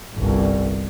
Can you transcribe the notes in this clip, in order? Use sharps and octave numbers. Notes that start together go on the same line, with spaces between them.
G1 C2